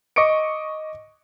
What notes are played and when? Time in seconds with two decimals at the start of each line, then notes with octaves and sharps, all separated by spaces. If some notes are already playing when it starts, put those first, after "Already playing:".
0.16 D#5 C#6 D6 C#7 D7